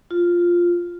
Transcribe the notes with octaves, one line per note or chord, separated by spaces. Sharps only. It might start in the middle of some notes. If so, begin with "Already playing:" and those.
F4